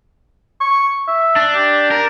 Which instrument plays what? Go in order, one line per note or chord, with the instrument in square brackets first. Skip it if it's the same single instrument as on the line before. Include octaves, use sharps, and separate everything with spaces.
[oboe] C#6
E5
[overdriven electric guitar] D4
[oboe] G4
[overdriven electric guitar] A#4